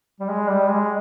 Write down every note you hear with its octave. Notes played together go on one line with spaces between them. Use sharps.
G3
G#3
G3
G#3